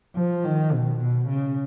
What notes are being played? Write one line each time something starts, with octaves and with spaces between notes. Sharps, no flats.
F3
D#3
B2
B2
C#3